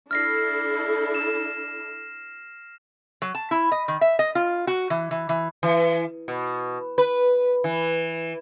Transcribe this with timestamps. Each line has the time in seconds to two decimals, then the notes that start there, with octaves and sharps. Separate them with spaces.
0.11 D4 E4 A4 F6 A#6 C7
1.14 E7
3.22 F#3
3.35 A5
3.51 E4
3.72 D#5
3.88 D#3
4.01 E5
4.19 D#5
4.35 F4
4.67 F#4
4.90 E3
5.11 E3
5.29 E3
5.63 E3
6.28 B2
6.98 B4
7.64 E3